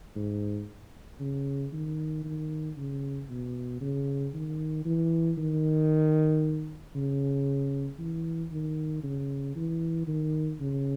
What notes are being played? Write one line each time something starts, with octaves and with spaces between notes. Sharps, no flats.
G#2
C#3
D#3
D#3
C#3
B2
C#3
D#3
E3
D#3
C#3
E3
D#3
C#3
E3
D#3
C#3